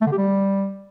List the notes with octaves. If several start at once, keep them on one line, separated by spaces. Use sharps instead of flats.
A3
D3
G4
G3